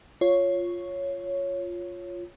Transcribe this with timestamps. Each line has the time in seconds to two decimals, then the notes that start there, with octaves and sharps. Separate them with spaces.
0.21 F4 C#5